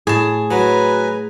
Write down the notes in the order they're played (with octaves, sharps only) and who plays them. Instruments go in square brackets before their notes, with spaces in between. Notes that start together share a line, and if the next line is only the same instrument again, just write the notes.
[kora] A2 [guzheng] G#4 A5
[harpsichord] F#3 [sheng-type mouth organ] B4 G#5 A#5